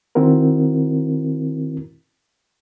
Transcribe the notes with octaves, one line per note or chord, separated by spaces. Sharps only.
D#3 C4 E4 F#4 A#4